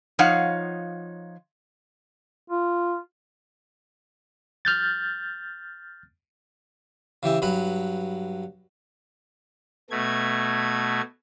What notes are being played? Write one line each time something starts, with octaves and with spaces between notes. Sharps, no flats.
F3 D#4 C#5 F5 F#5
F4
F6 G6 A6
C#3 E3 G4 E5
G2 F#3 B4 B5
B2 A3 G#6